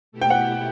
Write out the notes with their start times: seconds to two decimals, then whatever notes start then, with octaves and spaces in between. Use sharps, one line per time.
0.12 B2 A3 E4 G4
0.22 G5
0.30 F#5